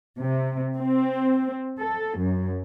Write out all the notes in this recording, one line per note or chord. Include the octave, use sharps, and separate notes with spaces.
C3
C4
A4
F#2